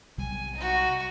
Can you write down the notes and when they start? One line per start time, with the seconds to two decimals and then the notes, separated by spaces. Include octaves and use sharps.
0.18 B1 C3 G3 G#5
0.55 D#4 F#4